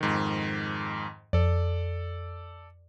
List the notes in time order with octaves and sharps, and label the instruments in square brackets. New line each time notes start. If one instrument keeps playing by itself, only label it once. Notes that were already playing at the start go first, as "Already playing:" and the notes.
[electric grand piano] F2 G#2 D#3
[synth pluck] F2 [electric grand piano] A4 D5